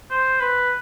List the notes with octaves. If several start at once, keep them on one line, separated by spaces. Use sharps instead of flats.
C5
B4